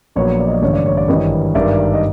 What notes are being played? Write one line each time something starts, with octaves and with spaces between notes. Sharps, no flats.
A#1 A#2 F#3 B3 C#5
D5
D#5
D5
A1 G2 D3 C#5
D5
C#5
D5
G#1 G2 E3 G3 C#5 D#5
G#1 G2 D#3 D5 E5
D#5